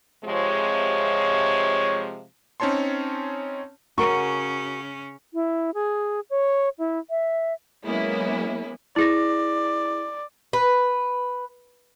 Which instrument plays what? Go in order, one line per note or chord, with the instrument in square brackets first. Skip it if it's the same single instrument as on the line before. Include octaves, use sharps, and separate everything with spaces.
[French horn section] C3 F3 G#3 [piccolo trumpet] C#5
[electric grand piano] C4 C#4 D#4 C#5 A5 C6
[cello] C#3 C#4 [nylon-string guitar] F#4 A#4 [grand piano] C#6
[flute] E4
G#4
C#5
E4
E5
[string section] F#3 G#3 A#3 B3 C#4 E4
[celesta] E4 G#4 A#6 [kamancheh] D5
[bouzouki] B4